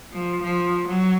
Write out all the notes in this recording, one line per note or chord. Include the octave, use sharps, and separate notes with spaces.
F3
F3
F#3